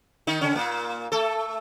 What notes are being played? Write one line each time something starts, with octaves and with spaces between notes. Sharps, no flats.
D#3 D#4
C#3 C#4
A#2 A#3
A3 A4